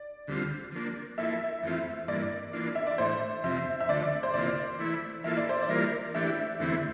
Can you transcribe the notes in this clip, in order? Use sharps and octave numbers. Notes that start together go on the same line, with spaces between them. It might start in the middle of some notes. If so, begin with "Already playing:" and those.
Already playing: D5
D2 D3 G3 C4 F4
F3 A#3 D4
F3 A#3 E4 A4 E5
F2 E3 A3 C4 F4
G2 E3 A#3 D5
E3 A#3 D4 F4
E5
D5
A2 E3 A3 C5
F2 C3 F3 C4 E5
E5
D2 D3 F3 A3 D5
C5
D2 C3 E3 A#3 F4 D5
E3 A3 E4
E3 A#3 F4 A4 E5
D5
C5
D5
E3 G3 A#3 F4 A#4
E3 A3 D4 G4 E5
E2 D3 A3 C4 E4